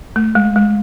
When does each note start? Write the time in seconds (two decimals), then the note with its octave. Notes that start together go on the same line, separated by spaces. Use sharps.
0.16 A3
0.35 G#3
0.56 G#3